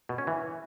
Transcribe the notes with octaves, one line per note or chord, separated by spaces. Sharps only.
B2
C#4
E3